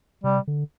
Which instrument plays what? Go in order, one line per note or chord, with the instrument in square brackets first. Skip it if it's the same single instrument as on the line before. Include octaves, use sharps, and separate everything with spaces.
[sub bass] C3 [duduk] G3
[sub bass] D3